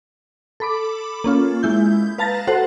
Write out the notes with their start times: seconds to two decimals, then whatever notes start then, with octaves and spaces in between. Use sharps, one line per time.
0.60 A4 B5 D6
1.24 A#3 C#4 F4
1.63 G#3 E4 G6
2.18 B4 F5 A5 A#5 A6 A#6
2.47 F#4 A4 C5 F#5